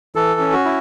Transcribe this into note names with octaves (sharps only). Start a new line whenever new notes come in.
E3 A4
C#4
F#4
E4